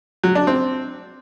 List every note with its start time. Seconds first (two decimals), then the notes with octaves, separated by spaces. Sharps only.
0.24 F#3
0.35 D4
0.47 C4